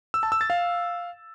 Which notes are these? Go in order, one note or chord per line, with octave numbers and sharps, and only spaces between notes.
E6
A5
E6
A6
F5